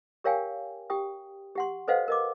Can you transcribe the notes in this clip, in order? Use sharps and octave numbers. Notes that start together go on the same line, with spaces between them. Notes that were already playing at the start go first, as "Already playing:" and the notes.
G4 A#4 C#5 F5 G5 G#5
G4 G5 D#6
G4 F#5 C6
A4 B4 C5 D#5 F5 F#5
A#4 D#5 D6